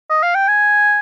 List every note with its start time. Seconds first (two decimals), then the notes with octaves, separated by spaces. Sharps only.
0.10 D#5
0.23 F5
0.35 G5
0.48 G#5